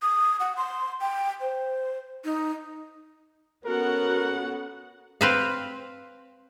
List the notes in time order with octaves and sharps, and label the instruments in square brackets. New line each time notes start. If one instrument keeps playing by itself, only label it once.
[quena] D#6
F#5
C6
G5
C5
D#4
[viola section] B3 F#4 F#5 [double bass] C#4 [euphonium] A4 [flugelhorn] A#4
[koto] C4 B4 F5